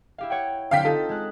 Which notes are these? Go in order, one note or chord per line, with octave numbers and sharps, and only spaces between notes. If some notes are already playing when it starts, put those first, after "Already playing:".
E4 G4 F5
C#5 F#5 G5
D3 C4 F5 G5 B6
D#4 F4 A4 G6
G#3 F#6